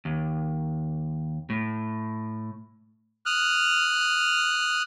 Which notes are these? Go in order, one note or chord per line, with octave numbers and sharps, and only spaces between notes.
D#2
A2
D#6 F6 F#6